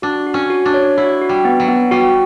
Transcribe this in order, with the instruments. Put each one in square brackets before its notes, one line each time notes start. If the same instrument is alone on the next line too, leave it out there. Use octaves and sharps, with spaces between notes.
[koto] D4 [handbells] F#4
[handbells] F#4
[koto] C#4
[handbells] F#4
[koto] D4
[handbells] C#5
[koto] E4 [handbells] F#4
[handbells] F#4
[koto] G3
[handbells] B3
[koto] F#3
[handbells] B3
[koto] G3 [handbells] F#4